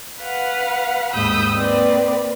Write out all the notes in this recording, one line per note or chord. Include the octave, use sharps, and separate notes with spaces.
B4 F5 F#5
D#2 G#2 B5 D#6 E6 G6
A#3 C4 B4 D5